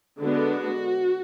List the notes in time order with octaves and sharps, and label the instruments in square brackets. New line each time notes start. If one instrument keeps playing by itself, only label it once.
[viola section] D3 G#3 B3 D4 F#4